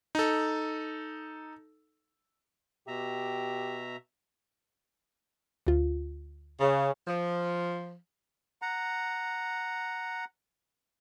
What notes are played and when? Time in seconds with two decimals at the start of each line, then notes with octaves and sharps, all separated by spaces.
0.15 D#4 A4
2.88 B2 G4 E5 A#5
5.67 D2 F4
6.60 C#3
7.08 F3
8.62 F#5 A#5